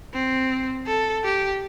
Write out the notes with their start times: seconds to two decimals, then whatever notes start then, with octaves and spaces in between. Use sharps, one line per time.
0.14 C4
0.87 A4
1.24 G4